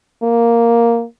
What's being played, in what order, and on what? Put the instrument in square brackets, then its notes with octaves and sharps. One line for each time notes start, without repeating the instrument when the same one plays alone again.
[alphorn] A#3